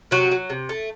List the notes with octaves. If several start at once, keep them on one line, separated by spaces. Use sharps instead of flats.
C3 F#3 F#4
F#3
C3
A3